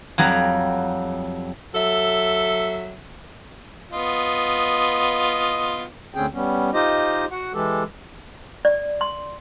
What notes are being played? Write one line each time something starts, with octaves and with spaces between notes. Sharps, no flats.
F2 F#3 G3 A#5
F#3 A4 E5
B3 F4 D#5
D2 D3 C4 C#4 G#4 G5
G3 B3 C#4
D#4 F4 G4 C5 D#5
F#4 F#5
E3 G#3 G4 A4
D5
C6